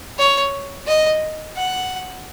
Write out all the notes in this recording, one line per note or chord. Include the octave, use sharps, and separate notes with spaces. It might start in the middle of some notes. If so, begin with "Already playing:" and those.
C#5
D#5
F#5